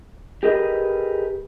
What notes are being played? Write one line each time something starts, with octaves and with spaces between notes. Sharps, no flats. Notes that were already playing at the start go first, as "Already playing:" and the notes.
G4 G#4 A#4 B4 D#5